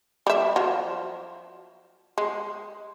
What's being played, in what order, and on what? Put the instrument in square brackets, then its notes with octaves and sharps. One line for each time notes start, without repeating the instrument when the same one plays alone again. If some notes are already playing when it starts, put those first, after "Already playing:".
[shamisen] G3 E5
F3 F#3
G#3